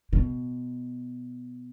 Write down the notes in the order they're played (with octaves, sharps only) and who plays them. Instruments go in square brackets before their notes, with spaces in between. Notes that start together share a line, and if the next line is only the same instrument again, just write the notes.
[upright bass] B2